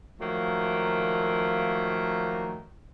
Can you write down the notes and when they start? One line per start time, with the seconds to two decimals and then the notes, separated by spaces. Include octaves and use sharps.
0.20 D#3 F3 F#3 A3 A#3